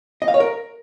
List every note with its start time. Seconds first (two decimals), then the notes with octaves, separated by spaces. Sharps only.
0.22 D#5
0.28 F5
0.34 C#5
0.40 A#4